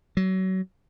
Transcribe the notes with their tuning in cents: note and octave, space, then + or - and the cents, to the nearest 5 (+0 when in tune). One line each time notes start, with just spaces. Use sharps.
F#3 +25